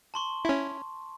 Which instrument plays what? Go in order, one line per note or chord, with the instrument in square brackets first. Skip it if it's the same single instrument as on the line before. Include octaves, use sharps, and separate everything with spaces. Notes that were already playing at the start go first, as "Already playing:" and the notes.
[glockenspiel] A5 C6 C#6
[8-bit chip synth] C#4 E4